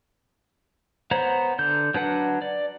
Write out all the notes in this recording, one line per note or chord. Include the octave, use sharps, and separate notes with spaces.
B3 C5 C#5 F#5 A#5
D3 G6
F#3 D4 B4 F#5
D5